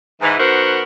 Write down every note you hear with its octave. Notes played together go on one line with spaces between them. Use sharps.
G#2 E3
D#3 B3 F#4 A#4 C5